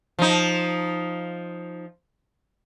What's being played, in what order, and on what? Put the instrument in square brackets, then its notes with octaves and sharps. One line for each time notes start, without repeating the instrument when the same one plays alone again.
[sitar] F3 D#4